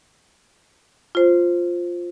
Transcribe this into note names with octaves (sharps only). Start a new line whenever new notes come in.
F4 C5